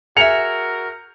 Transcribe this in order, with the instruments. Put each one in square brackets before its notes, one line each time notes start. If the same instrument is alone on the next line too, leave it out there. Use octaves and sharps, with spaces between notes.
[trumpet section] F#4 A#4 [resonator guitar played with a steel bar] G#4 E5 [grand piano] C#7 F7